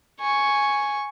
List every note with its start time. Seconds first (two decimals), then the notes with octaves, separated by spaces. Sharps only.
0.21 G#5 C#6